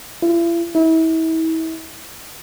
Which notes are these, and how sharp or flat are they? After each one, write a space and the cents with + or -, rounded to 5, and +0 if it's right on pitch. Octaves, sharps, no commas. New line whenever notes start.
E4 +45
E4 -35